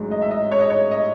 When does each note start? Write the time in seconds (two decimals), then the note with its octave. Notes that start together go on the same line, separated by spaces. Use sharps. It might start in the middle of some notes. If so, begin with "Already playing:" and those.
Already playing: A1 G#2 F#3 C#4
0.11 D#5
0.22 E5
0.31 D#5
0.52 C#5
0.60 D#5
0.70 C#5
0.91 D#5